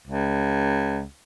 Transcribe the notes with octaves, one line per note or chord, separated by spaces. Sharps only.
C#2